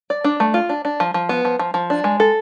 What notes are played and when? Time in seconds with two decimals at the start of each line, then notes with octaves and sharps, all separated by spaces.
0.10 D5
0.24 D4
0.40 A3
0.54 F4
0.69 D4
0.85 D4
1.00 F3
1.14 F3
1.29 B3
1.45 F3
1.59 F3
1.74 F3
1.90 D4
2.04 G#3
2.20 A4